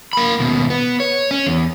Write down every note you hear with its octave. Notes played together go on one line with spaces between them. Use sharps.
A#3 B5
D#2 B2
B3
C#5
C#4
E2